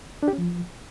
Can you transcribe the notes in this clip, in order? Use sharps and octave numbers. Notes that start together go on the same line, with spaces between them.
D4
G4
C#4
F3